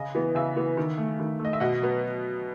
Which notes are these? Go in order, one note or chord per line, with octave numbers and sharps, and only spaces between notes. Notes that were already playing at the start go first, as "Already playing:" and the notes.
Already playing: C#3 D#5
E3 B3
C#3 E5
E3 B3
D#3
A3
D#3
A3
D#5
E5
B2 D#5 F#5
F#3 B3